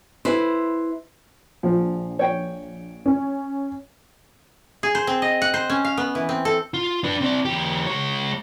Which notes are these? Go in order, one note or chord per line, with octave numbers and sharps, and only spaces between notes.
E4 B4 C5
A#1 F3
C#5 G5
C#4
G#4
C5
C4
D#5
F#5
C5
C#4
F5
B3
E3
C4
A4
F4
D4 B4
C4 D5
E2 G4
G#3 C#5